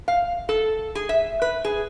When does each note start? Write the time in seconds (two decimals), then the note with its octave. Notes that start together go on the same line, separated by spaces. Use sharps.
0.08 F5
0.49 A4
0.95 G#4
1.09 E5
1.42 B4
1.65 G#4